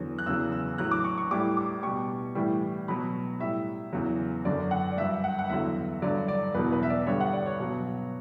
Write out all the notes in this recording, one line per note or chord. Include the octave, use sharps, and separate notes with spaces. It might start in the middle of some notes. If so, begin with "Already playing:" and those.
Already playing: E2 D3 F#3
F#6
E2 C#3 F#3 E6
E6
A2 F#3 F#6
D6
C#6
C#6
A2 G3 D6
D6
B2 G3 C#6
A2 E3 G3
B2 F#3 B5
A2 G3 E5
E2 C#3 F#3
F#2 D3 F#3 D5
F#5
D5
G2 F#3 E5
F#5
F#5
E2 D3 F#3 E5
G2 D3 F#3 D5
D5
E2 B2 F#3 B4
B4
E5
D5
G2 D3 G3 C#5
F#5
D5
C#5
B2 F#3